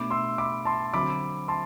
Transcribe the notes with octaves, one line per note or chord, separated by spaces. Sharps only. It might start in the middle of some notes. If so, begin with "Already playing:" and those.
Already playing: B2 A3 D4 B5 D6
C6 E6
B5 D6
A5 C6
D3 F#3 C4 B5 D6
A5 C6